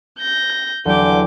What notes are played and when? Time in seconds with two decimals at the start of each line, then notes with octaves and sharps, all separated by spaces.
0.19 G6 A#6
0.85 E2 D3 F#3 G4 D6 G6